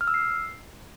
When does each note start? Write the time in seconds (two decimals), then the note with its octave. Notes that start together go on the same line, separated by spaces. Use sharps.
0.01 F6
0.07 E6
0.14 C7